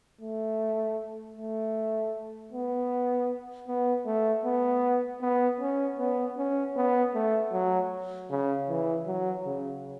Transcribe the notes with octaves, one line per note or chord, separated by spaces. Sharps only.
A3
A3
B3
B3
A3
B3
B3
C#4
B3
C#4
B3
A3
F#3
C#3
E3
F#3
C#3